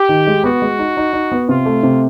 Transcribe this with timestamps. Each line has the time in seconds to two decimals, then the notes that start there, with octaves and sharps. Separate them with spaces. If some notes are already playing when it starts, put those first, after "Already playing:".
Already playing: G4
0.09 D#3
0.27 G#3
0.44 B3 F#4
0.62 G#3
0.79 D#4
0.97 D#4
1.13 D#4
1.32 B3
1.48 C3 F4
1.66 A3
1.83 C3